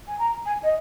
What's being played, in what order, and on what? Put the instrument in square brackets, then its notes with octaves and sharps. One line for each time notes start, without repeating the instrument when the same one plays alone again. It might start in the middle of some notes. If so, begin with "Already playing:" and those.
[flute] G#5
A#5
G#5
D#5